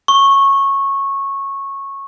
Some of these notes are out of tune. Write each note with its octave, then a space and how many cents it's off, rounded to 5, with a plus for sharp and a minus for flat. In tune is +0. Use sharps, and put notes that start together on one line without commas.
C#6 -15